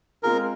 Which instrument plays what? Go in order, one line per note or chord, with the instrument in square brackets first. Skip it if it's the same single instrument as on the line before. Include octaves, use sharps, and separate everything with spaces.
[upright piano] G#3 C4 F4 G#4 [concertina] A#4